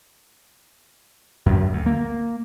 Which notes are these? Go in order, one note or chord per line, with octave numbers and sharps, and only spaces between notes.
F#2
D2
A#3